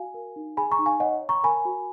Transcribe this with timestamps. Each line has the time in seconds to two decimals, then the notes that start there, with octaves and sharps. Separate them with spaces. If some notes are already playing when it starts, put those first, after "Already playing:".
Already playing: F#4 F5 G#5
0.14 A#4
0.36 D#4
0.57 G#4 G#5 B5
0.72 A#5 C#6
0.79 D#4
0.86 F5 G#5
1.00 C#5 D#5 F#5
1.22 C#5
1.29 A#5 C#6
1.43 A#4 G#5 B5
1.65 F#4